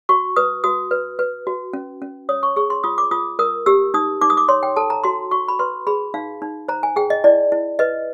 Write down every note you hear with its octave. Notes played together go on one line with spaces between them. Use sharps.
F#4 C#6
B4 D#6
F#4 D#6
B4
B4
F#4
C#4
C#4
C#5 D#6
C#6
G#4 C#6
C6
F4 D#6
D6
F4 D#6
A#4 D#6
G4 E6
D#4 D#6
D#4 D6
D#6
D6
C#5 C6
G5
A4 A5
A#5
F#4 C6
F#4 C#6
B5
B4 C6
G#4 B5
D#4 F5
D#4
C5 A#5
G#5
G#4 G5
D#5
E4 D5
E4
B4 D#5